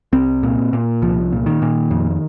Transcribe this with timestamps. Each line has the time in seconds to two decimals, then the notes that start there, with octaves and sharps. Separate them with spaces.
0.13 C2 C4
0.43 A#2
0.73 A#2
1.02 C2 F3
1.32 A#2
1.46 D#3
1.62 A#2
1.91 F2